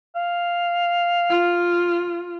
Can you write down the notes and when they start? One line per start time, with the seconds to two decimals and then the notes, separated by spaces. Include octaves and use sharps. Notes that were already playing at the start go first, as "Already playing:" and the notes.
0.16 F5
1.30 F4